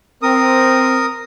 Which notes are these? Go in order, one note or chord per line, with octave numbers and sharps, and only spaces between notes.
C4 A#4 D#6